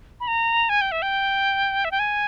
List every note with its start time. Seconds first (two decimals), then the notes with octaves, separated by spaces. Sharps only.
0.20 B5
0.28 A#5
0.69 G#5
0.81 G5
0.92 E5
1.02 G5
1.85 E5
1.91 G5
1.99 G#5